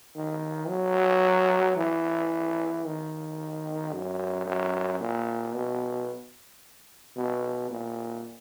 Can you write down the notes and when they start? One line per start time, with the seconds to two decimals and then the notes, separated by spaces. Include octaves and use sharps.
0.16 D#3
0.69 F#3
1.76 E3
2.85 D#3
3.93 F#2
4.46 F#2
5.00 A#2
5.55 B2
7.16 B2
7.70 A#2